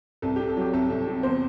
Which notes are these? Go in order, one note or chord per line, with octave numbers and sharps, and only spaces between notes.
C2 A4
C3 G4
A4
F#3 G4
C2 A4
C2
C3
E2 C5